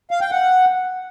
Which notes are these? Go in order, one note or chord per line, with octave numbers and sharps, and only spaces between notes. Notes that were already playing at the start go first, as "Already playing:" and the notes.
F5
G5
F#5